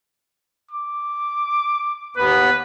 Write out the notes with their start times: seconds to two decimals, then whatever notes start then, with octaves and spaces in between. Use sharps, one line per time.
0.71 D6
2.17 D#2 B3 B4